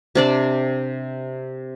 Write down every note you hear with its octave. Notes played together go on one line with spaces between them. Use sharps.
C3 D4 D5